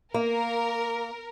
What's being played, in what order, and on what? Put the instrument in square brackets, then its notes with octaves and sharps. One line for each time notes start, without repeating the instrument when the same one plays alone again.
[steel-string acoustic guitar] A#3 [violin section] A#4